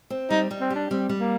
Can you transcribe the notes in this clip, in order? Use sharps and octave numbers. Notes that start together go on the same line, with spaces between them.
C4
G3 D#4
G3
C4
D4 G4
G3 C4
G3
A#3